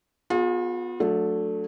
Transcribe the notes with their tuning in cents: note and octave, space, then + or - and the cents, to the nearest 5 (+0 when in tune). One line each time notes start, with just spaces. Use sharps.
B3 +0 F4 +40 G#4 +0
F#3 -35 A3 +0 D4 -15